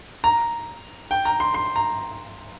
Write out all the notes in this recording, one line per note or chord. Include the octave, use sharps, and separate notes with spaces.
A#5
G5
A#5
C6
C6
A#5